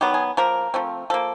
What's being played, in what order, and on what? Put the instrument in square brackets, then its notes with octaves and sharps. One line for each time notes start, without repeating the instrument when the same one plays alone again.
[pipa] D#3 F#3 B3 G4
G#4
F3 A#3 A#4
F3 A3 C4
F3 A#3 A4